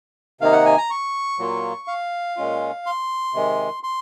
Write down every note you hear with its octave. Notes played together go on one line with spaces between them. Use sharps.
C3 D#3 A#3 D#4 F5
F#5
G#5
A#5
C#6
A#2 F#3 A#3 F4
F5
A#2 G#3 C#4 F4
C6
C3 D#3 G#3
C6